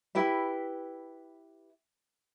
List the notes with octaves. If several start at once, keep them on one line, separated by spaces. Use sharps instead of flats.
E4 G4 B4 E5